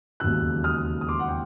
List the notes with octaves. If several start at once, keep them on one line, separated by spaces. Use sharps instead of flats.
E1 D#2 C#3 F#3 E6 F#6
D#6 F6
D#6
C6 D6
F#5
G5